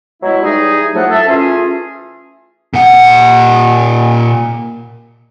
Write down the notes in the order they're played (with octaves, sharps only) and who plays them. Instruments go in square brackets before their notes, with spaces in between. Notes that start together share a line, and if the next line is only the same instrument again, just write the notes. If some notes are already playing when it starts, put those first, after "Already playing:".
[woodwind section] B2 F#3 G#3 E4
E3 G3 D#4 G#4
A2 F3 F#3 A3 A4 F#5
A4 E5
E3 A3 C#4 F4 G#4
[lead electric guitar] A#2 F#5